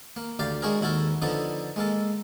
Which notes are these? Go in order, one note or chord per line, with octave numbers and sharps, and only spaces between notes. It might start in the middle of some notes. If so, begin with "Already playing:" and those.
A#3
D2 G4 D5 F5
G#3 D4 F#4 G#4 A#4
D#2 E4 F#4 A4 A#4
D3 F3 B3 D4 D#4 A4
G#3 A#3 A4